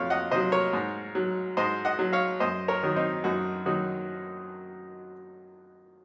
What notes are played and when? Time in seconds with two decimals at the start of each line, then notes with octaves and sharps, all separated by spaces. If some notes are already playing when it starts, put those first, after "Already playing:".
Already playing: F2 C3 F#3 C#5 F5
0.10 D#5 F#5
0.31 C3 F#3 C5 D#5
0.52 A#4 C#5
0.73 G#2
1.15 F#3
1.57 G#2 C5 D#5
1.85 D#5 F#5
1.99 F#3
2.13 C#5 F5
2.40 F#2 C5 D#5
2.68 A#4 C#5
2.83 D#3 F#3
2.96 C4 D#4
3.24 F#2 D#4 F#4
3.66 D#3 F#3 D#4 F#4